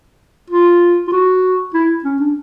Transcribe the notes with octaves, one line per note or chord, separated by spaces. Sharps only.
F4
F4
F#4
E4
C#4
D4